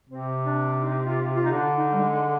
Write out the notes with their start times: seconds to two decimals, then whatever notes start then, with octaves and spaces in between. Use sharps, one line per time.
0.09 C3 C4
0.44 D4
0.80 D#4
1.04 F4
1.35 F4
1.43 D#4
1.51 D3 D4
1.75 D#4
1.92 G3
1.99 G#3